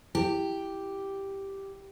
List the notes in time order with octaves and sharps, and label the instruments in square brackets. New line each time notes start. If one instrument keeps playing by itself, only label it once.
[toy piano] E4 [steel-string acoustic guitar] G4